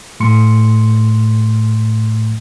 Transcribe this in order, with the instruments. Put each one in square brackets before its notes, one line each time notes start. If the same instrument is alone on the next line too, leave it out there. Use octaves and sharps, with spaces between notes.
[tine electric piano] A2 A3 C6 C#7